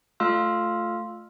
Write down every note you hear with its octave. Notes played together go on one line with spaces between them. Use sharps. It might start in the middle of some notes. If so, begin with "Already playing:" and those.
A3 F4 F5 C6 E6 F6